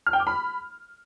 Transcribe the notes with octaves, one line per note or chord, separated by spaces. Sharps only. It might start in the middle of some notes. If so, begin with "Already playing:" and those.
F6
G5
D6
B5